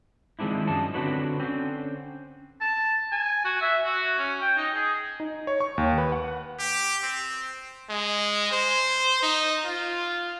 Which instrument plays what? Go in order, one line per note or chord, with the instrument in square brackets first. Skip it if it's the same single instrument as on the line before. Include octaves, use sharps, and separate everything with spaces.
[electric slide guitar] D#3 F3 G#3 C4 D4 E4
F#2 F3 D4 D#4 A5
D3 C4 D4 F#4 B4 C#5
D3 C4 C#4
[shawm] A5
G#5
F#4
E5
F#4
C#4
G5
D#4
G#4
[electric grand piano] D#4
C#5
C#6
D#2
B4
F#5
[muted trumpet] G4
C4
[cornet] G#3
C5
D#4
F4